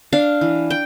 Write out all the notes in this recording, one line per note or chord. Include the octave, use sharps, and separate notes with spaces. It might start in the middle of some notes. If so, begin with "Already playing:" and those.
D4 F5
E3
G5